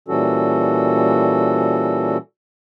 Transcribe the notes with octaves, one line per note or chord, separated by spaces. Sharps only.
A#2 E3 G3 C#4 F#4 A4